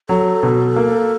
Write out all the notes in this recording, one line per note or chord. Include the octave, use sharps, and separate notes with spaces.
F#3 A4
B2
A#3